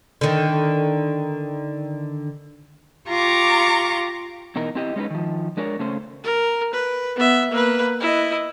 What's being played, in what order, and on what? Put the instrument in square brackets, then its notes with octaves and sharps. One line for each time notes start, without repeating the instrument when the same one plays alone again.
[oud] D3 D#3
[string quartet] F4 G4 A#5 C#6 D6
[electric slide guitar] B2 E3 D#4 A#4
C4 E4 G4 D#5
G#3 C#4 D#4 F#4 B4
D#3 F3
G#3 D4 A#4 C#5
C#3 A3 C#4 C5
[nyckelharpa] A#4
B4
B3 E5
A#3 B4
E4 D#5